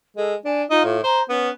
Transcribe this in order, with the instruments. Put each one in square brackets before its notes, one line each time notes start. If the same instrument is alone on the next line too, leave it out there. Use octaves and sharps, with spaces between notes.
[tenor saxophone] G#3 [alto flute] A4
[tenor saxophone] D4 [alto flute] G#5
[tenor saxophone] D#4 [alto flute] F4
[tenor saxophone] A2
[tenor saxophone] C5 [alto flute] A#5
[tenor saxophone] B3 [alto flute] C#4